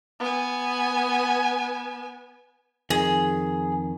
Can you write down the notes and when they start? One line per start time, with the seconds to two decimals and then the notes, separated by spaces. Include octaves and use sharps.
0.20 B3 G#5
2.90 F2 D#3 G#4